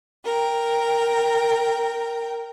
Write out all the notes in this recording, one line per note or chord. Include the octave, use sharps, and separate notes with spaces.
A#4 G5